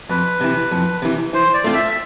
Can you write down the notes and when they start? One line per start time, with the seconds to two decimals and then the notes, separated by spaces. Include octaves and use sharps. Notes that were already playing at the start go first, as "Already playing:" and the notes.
0.09 F2 B4
0.41 C3 E3
0.71 F2
1.02 C3 E3
1.33 E3 C5
1.54 D5
1.64 A3 C4 F4
1.74 E5